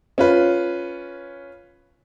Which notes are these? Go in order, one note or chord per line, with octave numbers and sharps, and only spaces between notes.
C#4 F4 B4